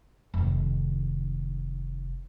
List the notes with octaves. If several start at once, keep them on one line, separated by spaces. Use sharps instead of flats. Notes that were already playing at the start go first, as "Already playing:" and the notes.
F1 D#3